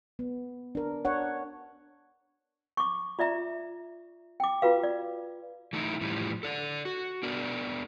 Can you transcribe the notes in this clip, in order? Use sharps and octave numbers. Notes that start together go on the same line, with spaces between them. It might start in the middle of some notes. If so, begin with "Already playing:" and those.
B3
D4 A#4
D4 C#5 F#5
C#6 D6
F4 D5 E5 A#5
G5 D6
F4 F#4 B4 F5
D5
E3 A3 C#4 D#4 E4
A2 E3 F3 G3
A4 D5
F#4
B3 D4 A#4 D5